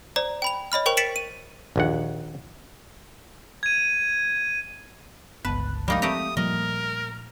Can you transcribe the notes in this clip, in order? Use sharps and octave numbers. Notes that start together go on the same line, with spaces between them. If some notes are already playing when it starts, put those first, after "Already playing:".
C5 D5 A#5
G5 B5 F7
C#5 D#5 B5 F6
A#4 C5 G5 C#6 F7
A6 B6 C#7 D7 E7 F#7
D#7
A#1 D#2 F#5
G#6 D#7
G1 C#2 B3 B4 A5 F#6
F3 G3 G#3 A#3 D#4 D#5
A3 C4 G4 A#5 D#6
A#2 F3 G3 A#4 D#5